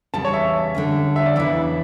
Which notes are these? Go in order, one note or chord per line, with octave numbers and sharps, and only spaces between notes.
E2 C#3 G3 A5
C#5
E5
D3 G3 C#4
E5
D5
E2 C#3 E3 E5